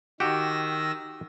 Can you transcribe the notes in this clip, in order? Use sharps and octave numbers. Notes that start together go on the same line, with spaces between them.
D#3 F#4 G4 E6 A#6